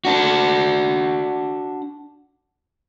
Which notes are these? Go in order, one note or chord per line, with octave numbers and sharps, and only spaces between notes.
D4 F#4